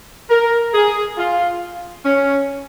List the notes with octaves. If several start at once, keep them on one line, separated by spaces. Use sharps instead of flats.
A#4
G#4
F4
C#4